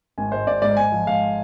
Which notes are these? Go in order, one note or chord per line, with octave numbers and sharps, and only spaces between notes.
G#1 G#5
G#2 C5
G#1 D5
G#2 D5
G#2 G#5
F3
G#2 F5